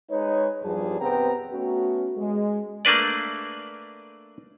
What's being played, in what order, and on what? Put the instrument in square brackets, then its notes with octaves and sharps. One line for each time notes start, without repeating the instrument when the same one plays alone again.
[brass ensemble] G#3 D#4 B4 C#5
E2 G2 F3 G3 G#4 A5
C3 B3 C4 B4 G5 A#5
A3 B3 C#4 F#4
G#3
[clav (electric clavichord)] A3 A#3 D4 B4 D5